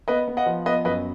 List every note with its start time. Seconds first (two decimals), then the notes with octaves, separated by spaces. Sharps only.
0.08 B3 B4 D#5
0.28 B3
0.37 D#5 F#5
0.46 F3
0.66 B3 B4 D#5
0.85 F#2 B4 D#5